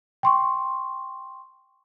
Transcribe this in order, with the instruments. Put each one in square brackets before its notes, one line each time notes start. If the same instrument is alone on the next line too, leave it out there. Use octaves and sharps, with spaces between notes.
[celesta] G5 C6 C#6